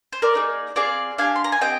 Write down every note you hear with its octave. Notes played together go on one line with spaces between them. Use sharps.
C5
A#4 D5
A#3 D#4 G#4
C4 F4 G#4 D5 F5
D4 G4 F5 G#5
C6
A#5
G#5
C4 G4 D#5 G5